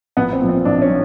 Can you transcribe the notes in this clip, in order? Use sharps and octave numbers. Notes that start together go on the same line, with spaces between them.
A#1 B3
C4
A#2 F3
C4
A#1 D4
C#4
F3